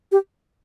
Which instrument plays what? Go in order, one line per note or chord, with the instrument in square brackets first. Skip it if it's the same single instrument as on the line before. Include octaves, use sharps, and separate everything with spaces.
[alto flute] G4